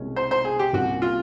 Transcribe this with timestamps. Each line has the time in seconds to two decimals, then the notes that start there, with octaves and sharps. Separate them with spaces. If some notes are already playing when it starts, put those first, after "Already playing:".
Already playing: C2 B2 G#3 C#4
0.16 C5
0.31 C5
0.45 G#4
0.59 G4
0.73 C2 A#2 G3 A#3 C#4 F#4
1.02 F4